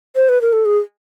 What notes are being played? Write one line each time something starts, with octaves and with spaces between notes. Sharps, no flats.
C5
B4
A#4
A4
G#4